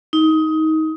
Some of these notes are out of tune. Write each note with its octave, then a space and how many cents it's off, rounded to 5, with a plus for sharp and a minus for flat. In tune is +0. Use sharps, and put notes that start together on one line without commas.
D#4 +20